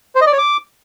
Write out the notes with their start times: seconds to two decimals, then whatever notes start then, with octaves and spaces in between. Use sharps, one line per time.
0.15 C5
0.21 D#5
0.27 D5
0.32 C#5
0.38 D6